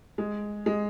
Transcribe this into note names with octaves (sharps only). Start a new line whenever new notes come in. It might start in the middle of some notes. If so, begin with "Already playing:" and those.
G#3
G#3